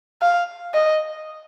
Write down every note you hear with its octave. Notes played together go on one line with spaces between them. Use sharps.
F5
D#5